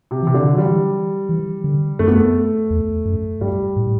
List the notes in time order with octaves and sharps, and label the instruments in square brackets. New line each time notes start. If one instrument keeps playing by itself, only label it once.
[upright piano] C3
[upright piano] C3 [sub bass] E3
[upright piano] D3
F#3
[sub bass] E3 [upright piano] G3
[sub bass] E3
D3
[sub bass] F#2 [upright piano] A3
[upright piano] B3
A3
[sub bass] E2
F#2
[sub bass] G2 [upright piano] G3
[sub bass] A2